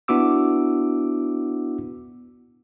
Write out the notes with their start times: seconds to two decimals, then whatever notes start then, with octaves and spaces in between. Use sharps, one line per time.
0.08 B3 D4 E4 F#4 D6 E6